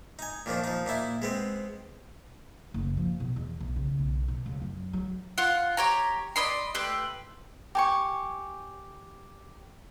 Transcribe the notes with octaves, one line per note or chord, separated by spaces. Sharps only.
D#4 G#5
A#2 D#3 F3 D4
F3 D#4
A#2 D#4 E4
G#3 B3 C4
F#1
F3
B2
E2
B1
C#3
B1
B2
C#2
F#2
F#3
F4 F#5
G4 C#5 A#5
D5 D#5 B5 C6
A3 G4 B4 C6
G4 G#5 C#6